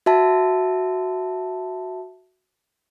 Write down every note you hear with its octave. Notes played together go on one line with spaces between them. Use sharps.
F#4 E5 A5